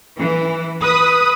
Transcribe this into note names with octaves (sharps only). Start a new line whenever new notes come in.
E3
B4 D#6